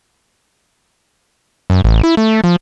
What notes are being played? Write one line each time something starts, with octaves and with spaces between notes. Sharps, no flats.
F#2
A1
E4
A3
F3